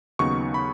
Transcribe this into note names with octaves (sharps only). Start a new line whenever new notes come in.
D#2 C#3 F#3 B3 D#4 C#6
B5